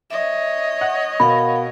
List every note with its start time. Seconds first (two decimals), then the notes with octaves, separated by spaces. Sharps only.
0.10 C#5 D#5 E5
0.81 F#5
1.20 B2 A#4 F5 F#5 B5